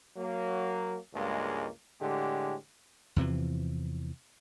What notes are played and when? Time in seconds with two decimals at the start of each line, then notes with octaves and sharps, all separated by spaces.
0.17 F#3 A#3
1.14 C#2 G2 G#3 A#3
2.00 A2 D3 G#3 G4
3.16 E2 C3 E3 F3